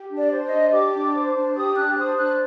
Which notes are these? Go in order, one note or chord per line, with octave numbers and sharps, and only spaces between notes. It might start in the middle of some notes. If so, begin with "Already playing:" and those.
Already playing: G4
D4
D5
C5
D#5
D4
G4 D6
D4
C5
D4
G4 D#6
D4 F#6
C5 D#6
D4 F#6